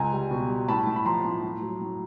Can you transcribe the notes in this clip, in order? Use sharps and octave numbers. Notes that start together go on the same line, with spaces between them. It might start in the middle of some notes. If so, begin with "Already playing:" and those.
Already playing: C#2 G#5 A#5
G3
B2
G3
A2 A5 B5
A2
B5
F3 A#5 C6
A2
A2
F#3
A2